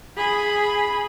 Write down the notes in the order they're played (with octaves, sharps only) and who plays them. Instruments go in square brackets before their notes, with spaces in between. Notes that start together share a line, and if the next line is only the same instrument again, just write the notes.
[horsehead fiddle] G#4 B5